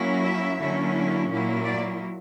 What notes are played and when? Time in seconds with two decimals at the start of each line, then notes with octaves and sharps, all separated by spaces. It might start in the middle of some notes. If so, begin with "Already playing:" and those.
Already playing: F#3 A#3 C#4 E4
0.24 E5
0.59 D3 F#3 A#3 C#4 E4
1.30 A#2 F#3 A#3 E4
1.65 D5